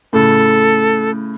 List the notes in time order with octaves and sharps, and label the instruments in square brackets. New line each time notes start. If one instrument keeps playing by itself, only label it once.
[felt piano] A2 C#3 [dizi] A4